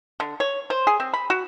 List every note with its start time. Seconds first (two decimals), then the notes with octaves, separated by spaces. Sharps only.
0.20 D3
0.40 C#5
0.70 C5
0.87 G#4
1.00 C4
1.13 B5
1.30 F#4